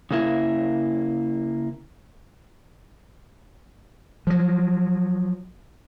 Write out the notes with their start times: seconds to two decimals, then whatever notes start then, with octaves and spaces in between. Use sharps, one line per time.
0.11 C#3 A#3 E4
4.27 F3 F#3